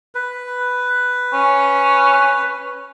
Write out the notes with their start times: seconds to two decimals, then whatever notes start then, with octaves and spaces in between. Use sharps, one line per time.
0.15 B4
1.33 C#4